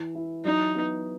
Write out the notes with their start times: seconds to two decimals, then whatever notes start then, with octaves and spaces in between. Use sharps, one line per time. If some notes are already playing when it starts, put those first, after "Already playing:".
Already playing: E3
0.15 E4
0.45 F#3 D#4
0.75 B3